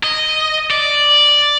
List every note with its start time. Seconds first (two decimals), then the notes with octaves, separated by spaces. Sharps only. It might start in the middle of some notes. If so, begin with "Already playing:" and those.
0.03 D#5
0.71 D5